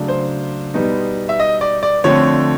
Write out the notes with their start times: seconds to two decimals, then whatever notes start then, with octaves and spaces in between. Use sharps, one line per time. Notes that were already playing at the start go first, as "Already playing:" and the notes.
Already playing: C#3 F#3 A3 D4
0.08 C5
0.74 B2 G3 B3 D#4
1.29 E5
1.40 D#5
1.61 D5
1.83 D5
2.04 D3 F3 A3 C4 C#5